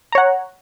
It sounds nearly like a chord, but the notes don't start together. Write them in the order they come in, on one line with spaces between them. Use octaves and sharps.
A#5 C#5 F#5